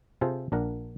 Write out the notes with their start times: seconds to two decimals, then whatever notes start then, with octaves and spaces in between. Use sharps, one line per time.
0.21 C3 F4 G#4 A4 C5
0.52 A#1 D4 A#4 F#5